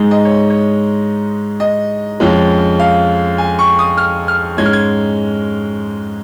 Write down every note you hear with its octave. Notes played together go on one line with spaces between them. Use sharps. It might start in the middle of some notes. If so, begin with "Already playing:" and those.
Already playing: G#2 G#3 D#4
D#5
C#5
C#5
D#5
F2 F3 G#3 C#4
F5
G#5
C#6
D#6
F6
F6
G#2 G#3 C#4 G#6
F6
G#6